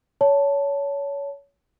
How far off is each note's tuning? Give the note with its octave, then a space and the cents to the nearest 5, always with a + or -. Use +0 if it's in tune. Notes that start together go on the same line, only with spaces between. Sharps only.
C#5 +25 A5 +5